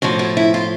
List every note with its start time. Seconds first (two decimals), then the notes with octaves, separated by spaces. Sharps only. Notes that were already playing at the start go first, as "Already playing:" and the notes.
0.02 A2 F3 F#4
0.19 E4
0.37 E4
0.54 F4